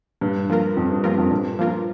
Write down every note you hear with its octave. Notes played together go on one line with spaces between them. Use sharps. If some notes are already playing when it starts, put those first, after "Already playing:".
G2 A#2
F3 A#3 F4 A#4
F2 A#2
G2
G2 F3 A#3 F4 A#4
F2
G2 A#2
F3 A#3 F4 A#4